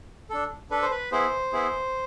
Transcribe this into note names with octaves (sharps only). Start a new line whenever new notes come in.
D4 A4
D4 A4 B4
C5
B4
B3 E4 G#4 C5
B3 E4 G#4